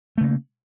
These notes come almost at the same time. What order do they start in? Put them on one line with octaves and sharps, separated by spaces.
A3 C#3 A#3